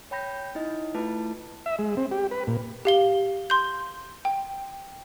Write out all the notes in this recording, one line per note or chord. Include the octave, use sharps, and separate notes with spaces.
C#5 G5 B5 G6 A#6
D#4 E4 D#5
A3 E4 F4 B4 A5
E5
G#3
C4
G4
B4
A#2
G4 F5 G7
C6 G6
G5